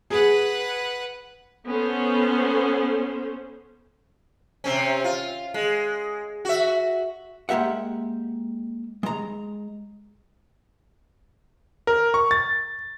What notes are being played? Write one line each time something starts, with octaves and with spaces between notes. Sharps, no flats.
G#4 B4 F#5
B3 C#4 A4 C5
C3 C4 C#4
F4
G#3
F#4 E5
G#3 A#3 G4 E5 F#5
G#3 A#5
A#4
C#6
A6